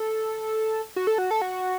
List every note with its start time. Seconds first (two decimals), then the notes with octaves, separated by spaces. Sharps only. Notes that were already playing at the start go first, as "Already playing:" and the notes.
Already playing: A4
0.96 F#4
1.07 A4
1.18 F#4
1.31 A4
1.42 F#4